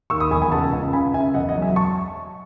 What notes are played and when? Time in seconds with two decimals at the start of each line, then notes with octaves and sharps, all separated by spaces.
0.10 D#2 C#6 E6
0.20 B5 D#6
0.31 E1 G#5 B5
0.42 G#5 B5
0.52 C#2 F#5 A5
0.73 C#2
0.93 C#3 G#5 B5
1.14 C#3 E5 G#5
1.34 E1 D#5 F#5
1.49 D#5 F#5
1.55 F#3
1.62 E5 G#5
1.76 A5 C#6